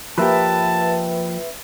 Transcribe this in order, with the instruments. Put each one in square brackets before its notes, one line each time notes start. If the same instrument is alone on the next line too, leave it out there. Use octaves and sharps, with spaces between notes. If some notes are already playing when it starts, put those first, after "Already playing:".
[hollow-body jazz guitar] F3 A#3 G4 [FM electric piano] B4 E5 [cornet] A5